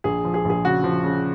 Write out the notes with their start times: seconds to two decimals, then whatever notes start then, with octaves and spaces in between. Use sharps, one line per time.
0.04 A#1 G#4
0.25 F3
0.34 G#4
0.45 A#1 G#4
0.65 C#3 F#4
0.84 F3
1.04 C#3